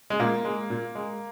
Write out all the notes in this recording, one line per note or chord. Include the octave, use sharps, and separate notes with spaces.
G#3
A#2 A#3
G#3
A#2
G#3